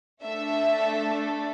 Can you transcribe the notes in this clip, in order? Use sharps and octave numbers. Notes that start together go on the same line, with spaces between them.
A3 D4 A4 E5